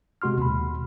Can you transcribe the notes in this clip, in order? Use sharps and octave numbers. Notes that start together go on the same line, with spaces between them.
C3 G#3 F#4 C6 F6
D#2 B2 B5